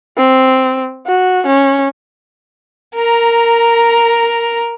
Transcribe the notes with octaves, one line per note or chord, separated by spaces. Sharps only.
C4
F#4
C#4
A#4 A#5